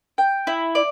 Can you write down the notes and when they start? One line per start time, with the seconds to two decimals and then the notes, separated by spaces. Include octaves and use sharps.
0.18 G5
0.47 E4
0.75 D5